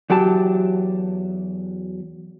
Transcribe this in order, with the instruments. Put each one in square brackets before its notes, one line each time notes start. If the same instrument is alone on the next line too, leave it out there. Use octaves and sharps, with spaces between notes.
[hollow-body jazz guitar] E2 F#3 G4 A5